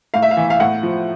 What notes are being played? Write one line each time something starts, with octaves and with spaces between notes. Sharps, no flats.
A2 F5
E5
F5
E3
F5
A2 F#5
F3